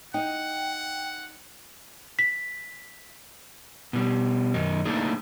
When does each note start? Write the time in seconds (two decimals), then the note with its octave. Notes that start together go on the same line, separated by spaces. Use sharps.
0.14 D#4 F#5 G5
2.19 B6
3.93 B2 G3
4.54 F#2 D#3 D#4
4.85 A3 A#3 D4 D#4 G#4